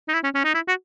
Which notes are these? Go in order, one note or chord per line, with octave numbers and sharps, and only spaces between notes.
D#4
E4
C#4
C#4
D#4
E4
F#4